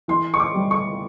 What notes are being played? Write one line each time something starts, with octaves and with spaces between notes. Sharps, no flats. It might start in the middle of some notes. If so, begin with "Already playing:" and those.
E3 C6
C#6
D6
G3
C#6